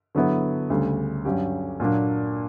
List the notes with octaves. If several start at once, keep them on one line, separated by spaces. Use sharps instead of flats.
D3 F#3 B3 E4
D2 C#3 G3
G2 F#3 C#4 G4
A#2 F#3 A#3 D4